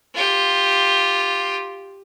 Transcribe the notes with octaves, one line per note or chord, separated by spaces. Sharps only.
F4 G4